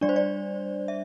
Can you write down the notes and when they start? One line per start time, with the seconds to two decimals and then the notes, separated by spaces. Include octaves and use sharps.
0.01 G3 D4 D5
0.09 C5
0.16 D5
0.88 E5